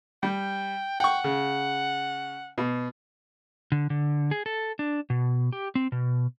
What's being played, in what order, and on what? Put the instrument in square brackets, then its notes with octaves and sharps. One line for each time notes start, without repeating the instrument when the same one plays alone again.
[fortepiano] G3 [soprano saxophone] G5
[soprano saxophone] F#5 [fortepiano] G5 C#6
[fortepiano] C#3
B2
[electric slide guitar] D3
D3
G#4
A4
D4
B2
G4
C4
B2